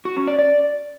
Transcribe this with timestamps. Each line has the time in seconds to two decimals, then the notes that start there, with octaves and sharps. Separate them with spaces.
0.05 F#4
0.16 C#4
0.28 D5
0.39 D5